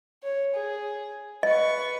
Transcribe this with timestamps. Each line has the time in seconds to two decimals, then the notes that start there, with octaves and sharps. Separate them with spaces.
0.23 C#5
0.54 G#4
1.43 B4 D#5 C#6